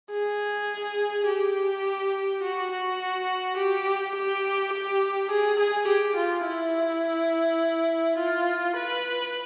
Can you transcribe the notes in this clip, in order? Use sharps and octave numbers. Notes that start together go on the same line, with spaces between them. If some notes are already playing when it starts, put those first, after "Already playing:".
G#4
G4
F#4
F#4
G4
G4
G4
G#4
G#4
G4
F4
E4
F4
B4